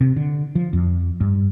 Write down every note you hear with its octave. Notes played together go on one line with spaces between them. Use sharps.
C3
D3
F3
F2
G2